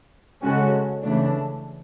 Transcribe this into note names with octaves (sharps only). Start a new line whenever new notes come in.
C#3 G#3 C#4 F#4 A4
C#3 E3 A3 D4